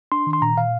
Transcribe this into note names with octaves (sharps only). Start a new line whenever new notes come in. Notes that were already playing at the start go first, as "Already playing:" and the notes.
D4 C6
D#3
C6
A#2 A#5
A#2 F5